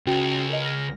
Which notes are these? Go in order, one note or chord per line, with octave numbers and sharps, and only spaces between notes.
C#2 C#4 F#4 G5
A#4 D#5
F6 A#6